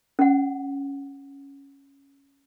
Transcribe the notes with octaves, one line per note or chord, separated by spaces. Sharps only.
C#4 F#5